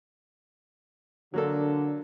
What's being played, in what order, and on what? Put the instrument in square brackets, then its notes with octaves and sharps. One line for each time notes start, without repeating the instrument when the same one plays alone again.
[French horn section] D3 [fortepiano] F#3 A#3 A4